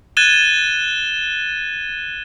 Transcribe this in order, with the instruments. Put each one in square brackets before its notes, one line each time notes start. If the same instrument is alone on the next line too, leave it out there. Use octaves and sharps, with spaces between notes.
[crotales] F#6 G#6 A6 D#7 E7 G7